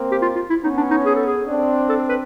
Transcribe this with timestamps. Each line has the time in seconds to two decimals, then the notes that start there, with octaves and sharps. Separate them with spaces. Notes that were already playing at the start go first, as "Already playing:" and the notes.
Already playing: A#3 C4
0.11 G4
0.22 F4
0.35 F4
0.50 E4
0.64 B3 C#4 D#4
0.77 D4
0.91 D#4
1.05 G#4
1.15 A4
1.26 G#4
1.47 C4 D4
1.89 A4
2.09 B4